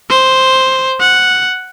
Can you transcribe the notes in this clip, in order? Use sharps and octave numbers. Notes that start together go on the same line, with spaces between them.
C5
F#5